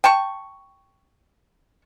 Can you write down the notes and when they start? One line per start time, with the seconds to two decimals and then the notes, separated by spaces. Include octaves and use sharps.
0.04 G5 A5 C#6